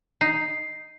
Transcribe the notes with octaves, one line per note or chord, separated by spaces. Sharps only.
D#4 C7